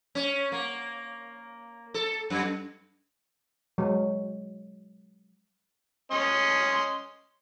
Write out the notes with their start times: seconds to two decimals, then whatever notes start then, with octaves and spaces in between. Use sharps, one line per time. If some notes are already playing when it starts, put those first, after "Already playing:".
0.15 C#4
0.52 A#3
1.94 A4
2.30 F#2
3.78 F#3 G#3
6.11 C#4 D#5 C6